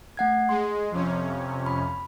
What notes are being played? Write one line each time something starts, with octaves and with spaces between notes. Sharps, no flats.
A3 F#5 G#6
G#3 C6
F2 C3 C#4
B5